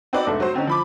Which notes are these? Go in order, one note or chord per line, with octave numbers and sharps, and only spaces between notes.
C4 D#4 F#4 B4 D5
F1 G#2 D4 A4 E5
F#3 F#4 C5
D3 C4 C#4 D#4
F3 B5 D6